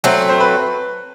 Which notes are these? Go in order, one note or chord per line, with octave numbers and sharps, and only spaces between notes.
F#3 A3 C4
C5
B4